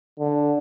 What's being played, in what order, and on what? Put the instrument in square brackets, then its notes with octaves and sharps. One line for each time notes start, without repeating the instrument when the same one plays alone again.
[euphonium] D3